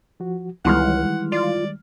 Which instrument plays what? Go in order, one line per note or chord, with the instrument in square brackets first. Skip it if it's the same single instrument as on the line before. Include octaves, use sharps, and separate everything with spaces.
[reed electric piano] F3 F#4
[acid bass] C#2 [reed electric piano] D#3 G3 G#3 [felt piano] E3 C6 F6 [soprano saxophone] F#5
[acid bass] F4 [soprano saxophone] D5